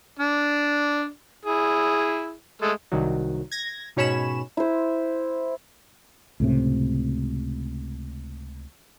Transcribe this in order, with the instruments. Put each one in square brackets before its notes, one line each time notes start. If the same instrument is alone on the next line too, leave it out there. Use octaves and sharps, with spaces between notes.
[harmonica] D4
E4 G#4
G#3 A3 A4
[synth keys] C2 D#3 F#3
G#6 A#6
G#2 B2 C#4 C#5 B5 E7
[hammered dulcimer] E4 C5
[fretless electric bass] C#2 A2 C3